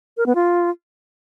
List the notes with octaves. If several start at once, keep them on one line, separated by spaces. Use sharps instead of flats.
A#4
B3
F4